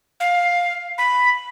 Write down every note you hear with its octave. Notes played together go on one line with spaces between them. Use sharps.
F5
B5